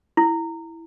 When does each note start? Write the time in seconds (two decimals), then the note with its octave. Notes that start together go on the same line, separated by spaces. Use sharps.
0.17 E4